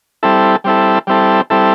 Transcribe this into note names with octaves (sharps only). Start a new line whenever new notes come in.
G3 C4 E4 A4
G3 C4 E4 A4
G3 C4 E4 A4
G3 C4 E4 A4